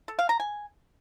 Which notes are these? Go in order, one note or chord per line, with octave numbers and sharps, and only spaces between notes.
A4
F5
A#5
G#5